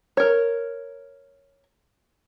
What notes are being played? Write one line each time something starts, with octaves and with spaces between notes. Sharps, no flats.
A#4 C#5